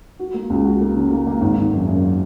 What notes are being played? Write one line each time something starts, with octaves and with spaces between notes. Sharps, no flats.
F#4
A#3
C#2
F#4
A#3
C#3
A#3
A#3
G#1
G#1
F#2
F#2